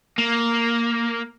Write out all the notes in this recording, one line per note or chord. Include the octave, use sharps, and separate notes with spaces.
A#3